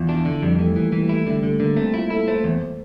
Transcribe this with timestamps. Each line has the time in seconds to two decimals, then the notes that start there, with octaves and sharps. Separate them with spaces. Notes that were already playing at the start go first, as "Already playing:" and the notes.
Already playing: E2 F4
0.08 D4 E4
0.25 D3
0.42 F2 G3
0.59 E3 A3
0.76 E3 A#3
0.92 E3 G3
1.09 A3 E4
1.26 D3 G3
1.43 D3 A3
1.60 D3 A#3
1.76 A3 C4
1.94 E4 F4
2.10 E4 A4
2.27 A3 C5
2.44 E2 C5